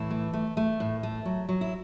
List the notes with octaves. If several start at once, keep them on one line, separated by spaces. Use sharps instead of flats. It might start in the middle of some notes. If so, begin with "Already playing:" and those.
Already playing: A2 E3 E4
A3
A3
A3
A2
A3
F#3
F#3
E4